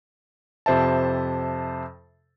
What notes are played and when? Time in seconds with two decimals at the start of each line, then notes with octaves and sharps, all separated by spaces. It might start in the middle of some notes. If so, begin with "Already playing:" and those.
0.66 F2 C3 C5 E5 A5